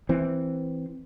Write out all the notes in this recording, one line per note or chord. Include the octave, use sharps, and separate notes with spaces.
E3 C4